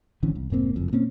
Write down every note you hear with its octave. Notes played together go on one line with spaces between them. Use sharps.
G#1 D3 E3 C#4
C2
F1 G#2 A#3 C4
F#1 F2 A2
B2 A#3 C4 C#4